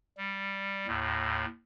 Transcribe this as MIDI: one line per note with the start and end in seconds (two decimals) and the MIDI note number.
0.18 0.87 55
0.87 1.45 39
0.87 1.45 45